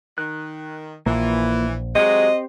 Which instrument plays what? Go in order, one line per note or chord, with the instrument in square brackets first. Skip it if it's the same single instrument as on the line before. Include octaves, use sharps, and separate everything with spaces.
[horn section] D#3 [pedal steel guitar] F#6
[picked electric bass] A#1 [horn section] E3 [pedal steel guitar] A#3 F4
[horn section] F#3 G#3 [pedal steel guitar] C4 G4 C5 [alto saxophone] D#5